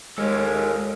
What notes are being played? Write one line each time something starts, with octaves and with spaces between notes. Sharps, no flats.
D#2 G#3 A4 A#4 C#5